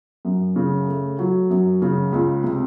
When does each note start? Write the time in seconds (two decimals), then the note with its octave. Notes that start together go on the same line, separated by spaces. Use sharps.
0.25 F#2
0.56 C#3
0.88 A3
1.19 F#3
1.50 F#2
1.82 C#3
2.12 C#2
2.44 C3